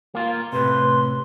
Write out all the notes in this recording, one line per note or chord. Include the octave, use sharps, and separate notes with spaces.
A#3 F4
A2 C3 B4 C6